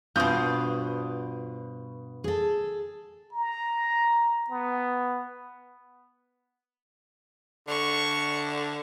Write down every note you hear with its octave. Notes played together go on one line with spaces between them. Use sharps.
G2 B2 F4 C5 D5 D#6 G6
G#4 A4
A#5
B3
D3 C#6